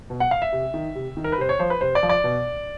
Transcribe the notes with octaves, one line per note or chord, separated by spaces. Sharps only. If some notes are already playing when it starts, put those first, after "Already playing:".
B2
F#5
F5
E5
C3
D#3
C3
D#3
A#4
B4
C3 C5
C#5
F3 C5
B4
C3 C5
D5
F3
D5
B2